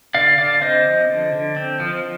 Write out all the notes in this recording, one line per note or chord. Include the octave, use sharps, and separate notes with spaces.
D3 D5 F5
D3 D5 F5
C4 C5 D#5
F3
D3
D3
C4
F3